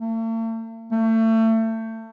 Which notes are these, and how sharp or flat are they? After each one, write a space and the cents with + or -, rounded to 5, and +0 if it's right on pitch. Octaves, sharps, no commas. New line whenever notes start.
A3 +45
A3 +30